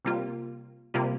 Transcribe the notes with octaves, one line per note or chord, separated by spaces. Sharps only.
C3 G3 A#3 F4
C3 G3 A#3 F4